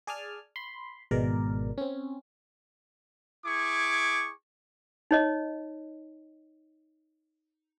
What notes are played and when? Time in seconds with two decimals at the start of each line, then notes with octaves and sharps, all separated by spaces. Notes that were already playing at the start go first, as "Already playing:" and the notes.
0.07 G#4 D5 G#5 A5 F6
0.56 B5 C6
1.11 G#1 B2 G#3 A#4 D5
1.78 C4 C#4
3.45 E4 G#4 C#6 D6
5.11 D#4 C#5 D#5